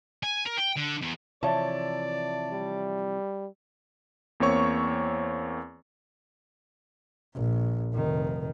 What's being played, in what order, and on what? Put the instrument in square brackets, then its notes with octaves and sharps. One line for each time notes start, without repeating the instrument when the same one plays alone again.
[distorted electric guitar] G#5
A#4
G5
D3
E2
[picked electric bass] C3 E3 F3 [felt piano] C#5 E5 A5 [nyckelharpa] D5
[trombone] G3
[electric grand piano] E2 A#3 C4 C#5 C#6
[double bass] A#1
F1 D#3